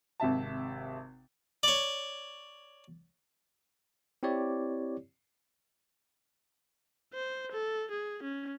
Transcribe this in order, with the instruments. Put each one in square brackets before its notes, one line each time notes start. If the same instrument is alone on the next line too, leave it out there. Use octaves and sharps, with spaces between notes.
[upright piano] G#1 C3 E5 A5
[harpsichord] C#5 D5
[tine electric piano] C4 E4 G4 C#5 D5
[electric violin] C5
A4
G#4
C#4